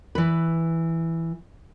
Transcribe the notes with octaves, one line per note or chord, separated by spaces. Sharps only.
E3 B4